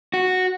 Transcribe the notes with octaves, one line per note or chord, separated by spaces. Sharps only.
F#4